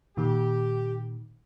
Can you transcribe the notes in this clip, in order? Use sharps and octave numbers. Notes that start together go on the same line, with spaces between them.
A#2 D#3 G4